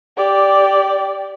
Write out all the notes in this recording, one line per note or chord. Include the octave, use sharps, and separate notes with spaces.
G4 D5